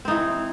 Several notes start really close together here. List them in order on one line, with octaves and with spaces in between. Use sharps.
C4 D#4 E3